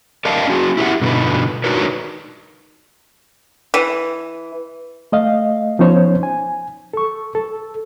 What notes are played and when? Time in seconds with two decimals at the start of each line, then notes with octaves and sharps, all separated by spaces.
0.25 A#4 D5 D#5 F5 G5 A5
0.47 C#4 F#4 G#4
0.77 E4 F4 G4 B4 E5 F#5
1.01 G2 B2 D3 D#4 F4 B4
1.64 D4 D#4 F#4 A#4 B4 C#5
3.74 E3
5.12 A3 D#5 F5
5.79 F3 B3 C#4 D#4 C5 C#5
6.23 G#5
6.93 A4 C#6
7.35 A4